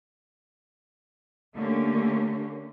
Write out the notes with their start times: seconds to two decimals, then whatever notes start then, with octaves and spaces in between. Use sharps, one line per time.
1.55 D3 A3 A#3 C#4 G4